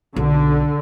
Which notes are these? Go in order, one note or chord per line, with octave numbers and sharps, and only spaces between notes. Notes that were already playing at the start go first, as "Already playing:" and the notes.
B1 D3